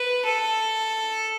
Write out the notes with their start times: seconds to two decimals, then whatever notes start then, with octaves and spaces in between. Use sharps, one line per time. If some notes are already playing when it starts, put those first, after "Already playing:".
Already playing: B4
0.25 A4